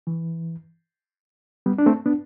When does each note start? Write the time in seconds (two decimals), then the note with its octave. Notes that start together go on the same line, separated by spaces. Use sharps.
0.07 E3
1.66 G3 B3
1.78 D4
1.86 A3 C4
2.06 B3 D4